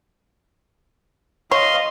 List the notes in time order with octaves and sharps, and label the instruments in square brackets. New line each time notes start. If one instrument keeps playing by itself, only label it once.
[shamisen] C#5 [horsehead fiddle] D#5 F5 [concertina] C6